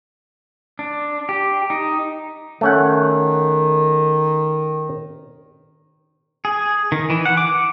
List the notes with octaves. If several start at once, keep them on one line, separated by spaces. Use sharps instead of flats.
D4
G4
D#4
D#3 A3 C#4 F#5
G#4
D#3
E3
F#5
D6